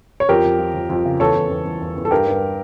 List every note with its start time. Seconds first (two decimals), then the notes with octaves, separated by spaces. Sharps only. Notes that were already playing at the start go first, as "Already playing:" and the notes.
0.20 C#5
0.29 F2 G4 A#4
0.44 F2
0.59 F3
0.74 F2
0.90 F2
1.05 C#3
1.20 E2 A4 C#5
1.36 E2
1.50 E2
1.65 E2
1.81 E2
1.96 E2
2.05 A4
2.11 G2 G4 A#4
2.27 G2